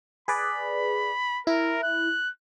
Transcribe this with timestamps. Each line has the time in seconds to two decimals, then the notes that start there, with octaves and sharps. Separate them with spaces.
0.28 G#4 B4 D5 B5
1.47 E4 A#4
1.83 F#6